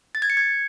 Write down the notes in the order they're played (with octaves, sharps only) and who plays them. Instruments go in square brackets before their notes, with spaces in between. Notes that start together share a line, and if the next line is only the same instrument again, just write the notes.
[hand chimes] A6
G#6
C#7
G#6